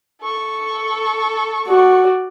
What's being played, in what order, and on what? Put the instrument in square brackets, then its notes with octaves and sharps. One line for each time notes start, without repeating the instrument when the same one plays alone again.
[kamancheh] A4 C#6
[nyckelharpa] F#4 D5